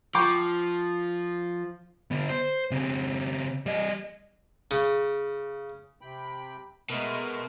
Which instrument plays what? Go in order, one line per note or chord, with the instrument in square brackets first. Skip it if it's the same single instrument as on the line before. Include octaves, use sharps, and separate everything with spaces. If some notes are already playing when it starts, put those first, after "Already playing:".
[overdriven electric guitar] F3 [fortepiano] G5 C#6 D6
[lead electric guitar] D3 B3
C5
C#3 C4
G3 D#5
[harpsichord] C#3
[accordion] C3 G5 B5
[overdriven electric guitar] B2 [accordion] G#3 A3 A#4